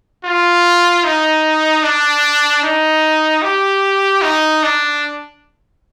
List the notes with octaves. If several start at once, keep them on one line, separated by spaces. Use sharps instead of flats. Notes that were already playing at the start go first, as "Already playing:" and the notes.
F4
D#4
D4
D#4
G4
D#4
D4